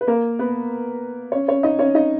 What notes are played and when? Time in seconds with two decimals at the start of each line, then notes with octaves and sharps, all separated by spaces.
0.01 B4
0.07 A#3 A#4
0.39 B3 B4
1.32 C#4 C#5
1.48 C#4 C#5
1.63 D#4 D#5
1.79 C#4 C#5
1.95 D#4 D#5